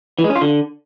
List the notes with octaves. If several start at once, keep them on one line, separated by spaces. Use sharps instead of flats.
E3
G#3
C#4
F4
D3